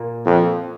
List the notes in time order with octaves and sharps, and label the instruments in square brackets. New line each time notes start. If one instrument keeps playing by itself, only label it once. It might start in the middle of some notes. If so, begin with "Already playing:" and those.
Already playing: [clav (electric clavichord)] A#2 A#3
[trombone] F2